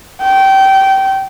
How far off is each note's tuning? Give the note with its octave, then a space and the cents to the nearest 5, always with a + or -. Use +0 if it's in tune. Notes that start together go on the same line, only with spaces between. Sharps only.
G5 -20